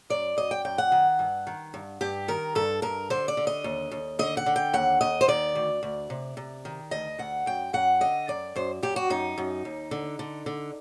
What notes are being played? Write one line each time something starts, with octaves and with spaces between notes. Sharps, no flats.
F#2 D5
F#2 D#5
G5
F#2 G5
F#5
D#3
G2
D#3
G2
G2 G4
D#3 A#4
G2 A4
G2 A#4
D3 C5
D5
D3
D#5
D#2
D#2
D3 D#5
F#5
D3
G5
D#2 F#5
D#2 D#5
C5
D#3 D5
D2
D2
C3
C3
D#3
D2 D#5
D2 F#5
F#2 G5
F#2 F#5
D3 D#5
F#2 D5
F#2 C5
F#2 G4
F#4
F#2 D#4
F#2
D#2
D3
D3
D3